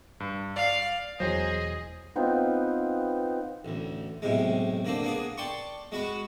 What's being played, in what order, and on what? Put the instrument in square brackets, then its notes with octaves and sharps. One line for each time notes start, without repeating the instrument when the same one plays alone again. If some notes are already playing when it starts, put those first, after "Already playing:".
[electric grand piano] G2
[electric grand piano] D5 [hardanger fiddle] F5
[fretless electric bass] E1 E2 F#3 [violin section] G#4 [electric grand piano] C5 [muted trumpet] D#5
[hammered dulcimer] B3 C4 D#4 F4
[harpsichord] A1 D2
B1 A2 C3 G#3
D3 A#3 C4 D4
A#3 B3 D4 G#4
D5 G5 A5 C6 C#6
G#3 F#4 B5 C#6